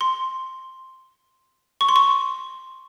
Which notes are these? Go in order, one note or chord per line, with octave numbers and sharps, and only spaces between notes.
C6
C#6
C6
C#6